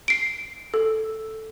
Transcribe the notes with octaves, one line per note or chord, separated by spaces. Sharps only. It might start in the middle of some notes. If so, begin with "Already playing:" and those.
C7 D7
A4